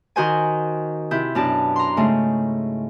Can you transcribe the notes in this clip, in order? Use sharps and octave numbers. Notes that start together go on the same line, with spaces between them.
D#3 F#4 C5 G#5
C3 E4 G6
F#2 B2 D4 A5
A#5 C6
G#2 C#3 A3